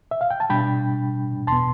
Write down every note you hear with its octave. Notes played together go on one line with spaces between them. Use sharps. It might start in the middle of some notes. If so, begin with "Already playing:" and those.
E5
F5
G5
A5
B2 G3 D4 G5 B5
E2 B2 B3 A5 C6